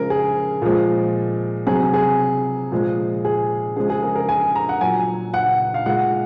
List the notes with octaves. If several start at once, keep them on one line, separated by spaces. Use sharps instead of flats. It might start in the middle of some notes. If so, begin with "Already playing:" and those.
Already playing: C#3 F3 G#3 A#4
G#4
A#2 F3 G#3
C3 F#3 G#4
G#4
A#2 F3 G#3
G#4
C#3 F3 G#3 G#4
G#4
A#4
A#4
G#5
A#5
F#5
A#2 F#3 G#5
F#5
F5
A#2 G#3 F#5